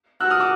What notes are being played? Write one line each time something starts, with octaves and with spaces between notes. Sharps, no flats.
F#4 E6 F#6
D#6 F6
D6 E6